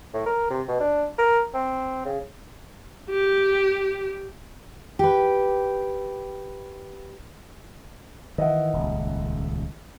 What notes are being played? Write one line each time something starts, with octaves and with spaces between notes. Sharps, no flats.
A2
A#4
C3
B2
D4
A#4
C4
C#3
G4
G4 B4
D#3 E3 D#5 E5 F#5
D#1 C#2